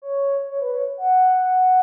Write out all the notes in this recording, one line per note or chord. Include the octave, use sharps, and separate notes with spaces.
C#5
C#5
B4
C#5
F#5